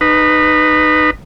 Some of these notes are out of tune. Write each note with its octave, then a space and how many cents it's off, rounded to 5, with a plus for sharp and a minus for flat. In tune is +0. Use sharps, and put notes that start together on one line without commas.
D#4 -20 B4 +0